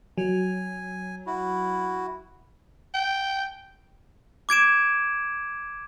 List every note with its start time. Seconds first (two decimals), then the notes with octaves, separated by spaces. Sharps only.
0.18 F#3 G#5
1.27 E4 F#4
2.94 G5
4.49 D6 G#6 D7 E7